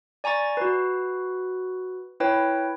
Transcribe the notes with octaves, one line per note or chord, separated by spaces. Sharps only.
D5 G#5 A#5 C#6 A6
F#4 B4
E4 B4 C#5 G5